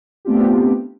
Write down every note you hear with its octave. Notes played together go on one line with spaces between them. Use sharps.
A3 B3 C4 D4 F4 G4